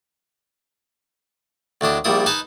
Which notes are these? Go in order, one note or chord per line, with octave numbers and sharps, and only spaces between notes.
D2 A2 D4 D#5
A#1 A#2 G3 E4 D#6
D#4 B4 G#5 A5